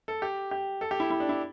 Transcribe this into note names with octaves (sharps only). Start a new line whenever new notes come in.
A4
G4
G4
A4
G4
E4
E4
D4
E4